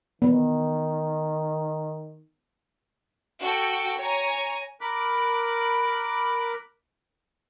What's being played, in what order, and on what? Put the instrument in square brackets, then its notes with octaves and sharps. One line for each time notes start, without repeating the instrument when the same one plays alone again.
[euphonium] D#3 [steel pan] B3
[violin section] F#4 A4 G5
C#5 G#5 A#5
[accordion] A#4 B5 D6 F#6